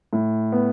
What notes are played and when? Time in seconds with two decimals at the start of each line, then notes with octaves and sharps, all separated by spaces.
0.13 A2
0.52 B3